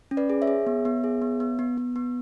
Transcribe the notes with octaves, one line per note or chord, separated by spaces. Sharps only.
C#4
B4 D5
G#4
C#5 E5
G#4
B3
B3
G#4
B3
B3
B3
B3
B3